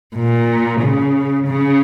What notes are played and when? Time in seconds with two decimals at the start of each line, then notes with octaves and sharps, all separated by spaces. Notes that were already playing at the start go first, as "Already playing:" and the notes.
0.16 A#2
0.81 C#3
1.47 C#3